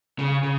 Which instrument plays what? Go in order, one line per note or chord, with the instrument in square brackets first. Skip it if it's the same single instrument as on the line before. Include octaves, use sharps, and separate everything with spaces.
[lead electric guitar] C#3
C#3